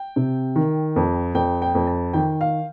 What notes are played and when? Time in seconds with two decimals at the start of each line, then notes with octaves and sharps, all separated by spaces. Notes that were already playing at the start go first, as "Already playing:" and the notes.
Already playing: G5
0.16 C3
0.56 D#3
0.96 F2
1.35 F2 G5
1.62 G5
1.75 F2
1.87 A5
2.13 D#3 G5
2.41 F5